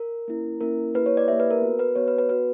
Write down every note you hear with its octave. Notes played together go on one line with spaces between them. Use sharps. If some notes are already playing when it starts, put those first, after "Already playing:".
Already playing: A#4
A#3 C#4 E4
A#3 C#4 E4 A#4
A#3 E4 G4 B4
C#5
D5
A#3 E4 G4 E5
B4
A#4
B3 F#4
B4
B3 F#4 C#5
B4
B4
B3 F#4 B4